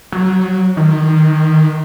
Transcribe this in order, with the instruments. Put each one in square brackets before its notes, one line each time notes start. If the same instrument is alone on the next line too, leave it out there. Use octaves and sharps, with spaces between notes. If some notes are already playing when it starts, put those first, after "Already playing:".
[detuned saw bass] F#3
D#3